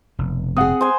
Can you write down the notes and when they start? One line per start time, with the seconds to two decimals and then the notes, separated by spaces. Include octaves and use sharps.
0.19 F1 B2
0.57 C4 G#4 F#5 D#6
0.81 C5 G#5